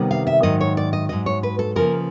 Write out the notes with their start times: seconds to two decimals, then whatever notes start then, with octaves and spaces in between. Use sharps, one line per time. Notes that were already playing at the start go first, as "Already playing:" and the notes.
Already playing: C3 D#3 G3 B3
0.11 F5
0.27 E5
0.43 G#2 D#3 F#3 D#5
0.61 C#5
0.77 D5
0.93 D#5
1.09 G#2 D#3 F#3 D#5
1.26 C#5
1.43 B4
1.59 A4
1.76 C#3 F3 A#3 A#4